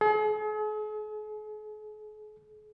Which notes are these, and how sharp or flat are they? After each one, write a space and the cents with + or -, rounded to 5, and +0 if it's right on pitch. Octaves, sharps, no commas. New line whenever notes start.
G#4 +45